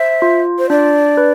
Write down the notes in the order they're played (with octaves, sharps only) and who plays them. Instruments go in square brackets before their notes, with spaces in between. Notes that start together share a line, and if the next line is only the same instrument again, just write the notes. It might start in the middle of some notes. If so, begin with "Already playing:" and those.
Already playing: [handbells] C5 [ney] E5
[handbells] F4
[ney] C5
[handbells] D4 [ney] D5
[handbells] B4